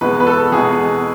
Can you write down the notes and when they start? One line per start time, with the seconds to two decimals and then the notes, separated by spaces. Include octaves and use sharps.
0.01 E2 B2 G#3 B4
0.20 B4
0.27 A4
0.52 E2 B2 G#3 G#4